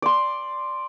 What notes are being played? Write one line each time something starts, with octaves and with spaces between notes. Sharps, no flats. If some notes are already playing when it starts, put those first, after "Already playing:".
D5 C6